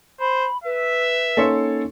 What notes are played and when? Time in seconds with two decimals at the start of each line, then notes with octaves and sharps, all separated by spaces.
0.20 C5 B5
0.64 B4 E5
1.37 A#3 C#4 D#4 A4 C#5 C6